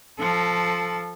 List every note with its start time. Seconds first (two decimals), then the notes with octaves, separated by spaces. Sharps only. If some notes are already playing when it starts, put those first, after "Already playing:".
0.19 F3 A4